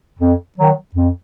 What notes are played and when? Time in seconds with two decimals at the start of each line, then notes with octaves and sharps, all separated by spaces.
0.19 F2
0.57 D#3 F#3
0.95 F2